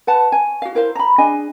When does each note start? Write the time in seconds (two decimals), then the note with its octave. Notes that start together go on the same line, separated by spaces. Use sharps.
0.07 B4 F#5 A5
0.32 C#5 G#5
0.62 F#4 F5
0.75 E4 A#4 C5 F5
0.95 A#5 B5
1.18 D4 G#4 D#5 G#5